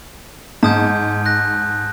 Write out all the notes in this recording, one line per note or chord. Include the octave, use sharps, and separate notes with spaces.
G#2 A5 D#6 G6
F#6 A#6